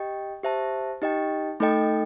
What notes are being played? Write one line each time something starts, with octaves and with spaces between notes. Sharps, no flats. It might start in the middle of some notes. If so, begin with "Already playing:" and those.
Already playing: G4 D#5 G5
G4 C5 E5 A5
D#4 G4 D#5 G5
A3 D#4 A4 D#5 G5